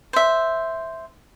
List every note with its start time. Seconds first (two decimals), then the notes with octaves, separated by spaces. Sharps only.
0.13 C5 E5